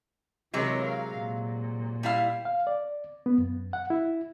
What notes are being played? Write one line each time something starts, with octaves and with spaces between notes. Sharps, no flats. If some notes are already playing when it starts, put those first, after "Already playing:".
C3 E3 F#3 G#3 A#4 C#5
F5
A#2
G3 E4 F5
F5
D5
B3
F#2
F#5
E4